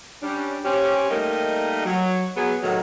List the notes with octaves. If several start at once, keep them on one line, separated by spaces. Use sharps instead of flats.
G3 C#4 D4
C4 C#4 G4
G3 A3 A#3 D#4 A#4 D#5
F#3
F#3 B3 G#4
A2 C3 D#3 F#3